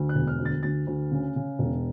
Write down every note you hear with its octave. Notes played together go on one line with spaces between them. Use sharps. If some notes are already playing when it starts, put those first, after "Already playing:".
Already playing: D2
F#6
E1
F6
D2
A6
D2 A6
D2
C#3
C#3
E1